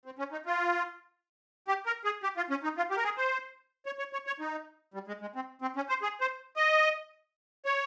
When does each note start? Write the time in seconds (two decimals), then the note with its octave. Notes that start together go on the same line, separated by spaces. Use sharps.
0.05 C4
0.19 C#4
0.32 D#4
0.46 F4
1.68 G4
1.86 A#4
2.05 G#4
2.23 G4
2.37 F4
2.50 C#4
2.64 D#4
2.77 F4
2.91 G4
2.97 A#4
3.04 G#4
3.18 C5
3.86 C#5
3.99 C#5
4.13 C#5
4.27 C#5
4.40 D#4
4.94 G3
5.07 G#3
5.21 G#3
5.35 C4
5.62 C4
5.76 C#4
5.89 C5
6.03 G#4
6.21 C5
6.57 D#5
7.66 C#5